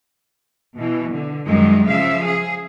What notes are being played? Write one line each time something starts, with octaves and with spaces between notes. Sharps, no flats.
B2 E3
D3
F#2 D#3 G3 G#3
C#3 F3 E5 F5
G#4